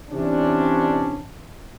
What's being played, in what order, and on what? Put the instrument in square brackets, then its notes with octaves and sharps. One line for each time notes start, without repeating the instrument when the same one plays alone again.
[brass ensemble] C3 E3 C#4 D4